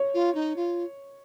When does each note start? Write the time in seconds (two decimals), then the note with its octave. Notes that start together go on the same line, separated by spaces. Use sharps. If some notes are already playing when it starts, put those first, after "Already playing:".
Already playing: C#5
0.14 F4
0.35 D#4
0.56 F4